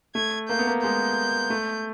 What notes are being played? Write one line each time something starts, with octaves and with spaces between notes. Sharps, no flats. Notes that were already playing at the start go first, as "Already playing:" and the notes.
A3 G#6
A#3 G6
B3
A#3
G#3 G6
A3